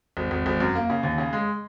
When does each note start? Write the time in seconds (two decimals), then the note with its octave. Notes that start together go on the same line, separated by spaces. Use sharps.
0.17 G#1
0.31 G#1
0.46 G#1
0.60 F#2
0.75 A#3
0.90 C#3
1.03 D#2
1.18 C#3
1.33 G#3